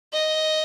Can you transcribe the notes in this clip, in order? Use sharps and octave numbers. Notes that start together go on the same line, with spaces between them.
D#5